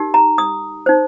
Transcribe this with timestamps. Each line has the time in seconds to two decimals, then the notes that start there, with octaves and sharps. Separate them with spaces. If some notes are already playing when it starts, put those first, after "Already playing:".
Already playing: D#4 G4 A#4
0.14 A#5
0.38 D#6
0.86 D#4 C5